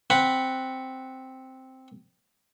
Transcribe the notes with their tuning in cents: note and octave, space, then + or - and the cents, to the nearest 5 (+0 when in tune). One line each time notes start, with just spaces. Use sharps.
C4 +0 F#5 +0 B5 +0